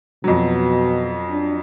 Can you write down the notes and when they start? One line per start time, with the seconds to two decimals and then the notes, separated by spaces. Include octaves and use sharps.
0.24 F2 B2 F#3
1.30 D4